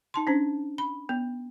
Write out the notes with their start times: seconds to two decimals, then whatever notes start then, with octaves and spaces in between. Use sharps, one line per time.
0.14 D#4 A5 C6
0.27 C#4 D4 C5
0.78 B5
1.09 B3